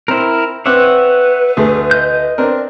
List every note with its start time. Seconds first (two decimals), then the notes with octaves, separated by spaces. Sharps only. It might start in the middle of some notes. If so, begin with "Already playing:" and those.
0.08 C4 E4 A#4 C5
0.66 C4 B4 C#5 E5 F#5 D6
1.57 D2 A3 G#4
1.91 D#5 G6
2.38 C4 D4 A#4